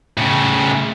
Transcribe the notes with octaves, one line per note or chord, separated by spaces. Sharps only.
A2 C#3